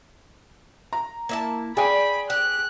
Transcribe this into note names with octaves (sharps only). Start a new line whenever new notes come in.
A#5
A#3 E4 A5
G#4 D5 G5 G#5 B5
G4 F#6